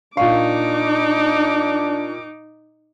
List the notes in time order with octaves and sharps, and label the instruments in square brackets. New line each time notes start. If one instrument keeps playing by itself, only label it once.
[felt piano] A#2 C#6 [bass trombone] D4 [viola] D#4 D6 [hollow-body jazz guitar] F5